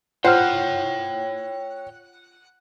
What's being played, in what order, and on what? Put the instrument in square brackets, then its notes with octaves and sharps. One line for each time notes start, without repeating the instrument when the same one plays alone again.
[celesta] F4 F6 [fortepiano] C5 [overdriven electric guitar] C#5 G5 [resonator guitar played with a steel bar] F#5